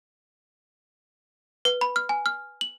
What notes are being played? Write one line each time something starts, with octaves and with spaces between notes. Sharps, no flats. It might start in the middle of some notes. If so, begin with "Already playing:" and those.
B4
B5
F6
G#5
F6
F#7